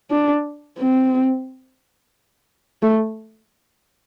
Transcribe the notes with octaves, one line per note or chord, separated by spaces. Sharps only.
D4
C4
A3